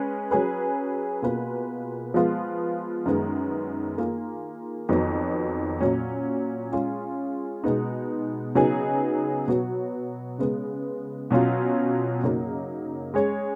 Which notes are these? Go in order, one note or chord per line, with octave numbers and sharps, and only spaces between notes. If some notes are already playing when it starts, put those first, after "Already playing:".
Already playing: G#3 C#4 G#4 B4
F#3 C#4 G#4 B4
B2 A#3 F4 G#4 B4
F3 G#3 B3 F4
F#2 D#3 G#3 B3
D#3 A#3 F4 G#4
F2 D#3 F#3 B3
A#2 F#3 C#4
G#3 C#4 F4 G#4
B2 G#3 B3 D#4
C#3 F#3 B3 D#4 G#4
B2 F#3 B3 F#4 C#5
C#3 G#3 B3
B2 F#3 C#4 F4
F#2 C#3 F#3 A#3 D#4
G#3 C#4 G#4 C#5